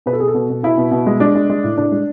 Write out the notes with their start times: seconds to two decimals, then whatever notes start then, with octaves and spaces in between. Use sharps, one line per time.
0.06 B2 B4
0.13 A4
0.20 B2 G#4
0.28 A4
0.34 B2
0.50 B2
0.63 B2 E4
0.77 B2
0.91 B2
1.07 G#3
1.20 G#3 D4
1.35 G#3
1.50 G#3
1.64 A2
1.78 A2 D4
1.92 G#3